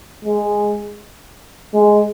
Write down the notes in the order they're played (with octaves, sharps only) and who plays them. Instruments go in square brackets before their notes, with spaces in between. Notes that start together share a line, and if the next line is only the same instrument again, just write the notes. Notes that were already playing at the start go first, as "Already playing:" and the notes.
[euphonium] G#3
G#3